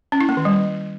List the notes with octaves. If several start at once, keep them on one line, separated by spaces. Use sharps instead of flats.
C#4
E4
A#3
D#3
G3